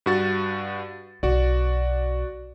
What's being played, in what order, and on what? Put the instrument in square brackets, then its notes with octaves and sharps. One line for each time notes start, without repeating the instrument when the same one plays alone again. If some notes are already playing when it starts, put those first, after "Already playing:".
[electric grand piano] G2 F#4 A6
[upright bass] B1 [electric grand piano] F#4 D5